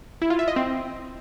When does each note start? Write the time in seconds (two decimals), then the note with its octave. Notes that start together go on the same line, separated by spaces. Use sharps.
0.22 E4
0.30 F4
0.39 E5
0.48 D#5
0.56 C4